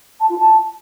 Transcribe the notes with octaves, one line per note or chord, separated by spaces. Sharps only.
A5
F4
A5